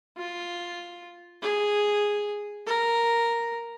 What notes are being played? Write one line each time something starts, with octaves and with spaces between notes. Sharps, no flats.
F4
G#4
A#4